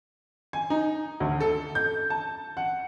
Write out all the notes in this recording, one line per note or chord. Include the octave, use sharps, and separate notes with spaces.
G#5
D#4
D2
A4
G6
A5
F#5